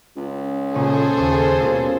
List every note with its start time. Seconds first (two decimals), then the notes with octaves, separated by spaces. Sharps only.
0.16 C#2
0.75 A#2 C#3 C#4 G#4 A4 C5
1.18 D#2 C#3
1.61 C#2 B2 A#3